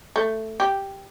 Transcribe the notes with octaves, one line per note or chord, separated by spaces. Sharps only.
A3
G4